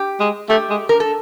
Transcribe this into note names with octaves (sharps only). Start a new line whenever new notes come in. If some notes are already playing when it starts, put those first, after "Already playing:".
Already playing: G4
G#3
A3 G4
G#3
A#4
A4